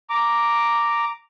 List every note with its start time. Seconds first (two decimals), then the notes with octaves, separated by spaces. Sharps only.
0.10 A#5 D6